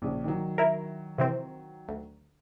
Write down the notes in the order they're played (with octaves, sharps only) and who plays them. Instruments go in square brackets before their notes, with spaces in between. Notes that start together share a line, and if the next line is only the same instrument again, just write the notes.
[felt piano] A#1 C#3
D#3 F#3
[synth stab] E4 A#4
C3 E3 C4
D2